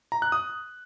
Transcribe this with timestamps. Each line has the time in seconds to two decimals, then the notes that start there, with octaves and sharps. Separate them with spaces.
0.12 A#5
0.22 F#6
0.32 D#6